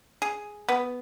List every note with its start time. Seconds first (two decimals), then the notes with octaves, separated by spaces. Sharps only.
0.22 G#4
0.69 B3